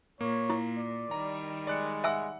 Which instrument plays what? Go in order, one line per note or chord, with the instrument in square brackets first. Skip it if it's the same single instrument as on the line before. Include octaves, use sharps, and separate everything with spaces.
[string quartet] A#2 [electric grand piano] A#3 [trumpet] C#5
[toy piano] E4
[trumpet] D5
[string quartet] D#3 G3 [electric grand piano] A#5
[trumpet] G#3 [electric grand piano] D5 F#6 C#7
[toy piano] E5 G#5 E6 [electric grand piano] F#5 F#6